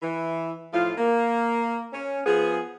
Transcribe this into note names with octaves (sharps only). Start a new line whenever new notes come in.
E3
A2 F3 F4
A#3
C#4
F3 B3 G#4